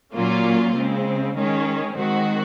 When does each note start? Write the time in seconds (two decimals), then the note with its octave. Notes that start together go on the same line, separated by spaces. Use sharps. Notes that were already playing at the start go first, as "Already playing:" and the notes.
0.15 A#2 F#3 A#3 C#4 F4
0.74 C#3 G#3 C4
1.35 D#3 G#3 C#4
1.95 D#3 G#3 C4 F#4